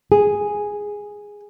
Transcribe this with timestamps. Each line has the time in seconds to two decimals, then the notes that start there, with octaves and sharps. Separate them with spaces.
0.12 G#4